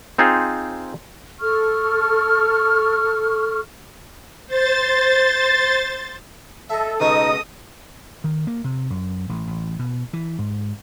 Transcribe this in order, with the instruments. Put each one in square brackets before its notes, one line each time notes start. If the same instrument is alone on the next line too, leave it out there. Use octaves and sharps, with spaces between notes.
[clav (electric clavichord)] C4 D#4 F4 G#4 C5
[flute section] A4 C#6 F6
[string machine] C5 A6
[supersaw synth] A4 [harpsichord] D#5 E5
[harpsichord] C#2 B2 C#6 [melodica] D#4 [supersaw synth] D#5 [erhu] D#6
[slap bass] D#3
A#3
C3
F#2
A1
A1
B2
E3
G#2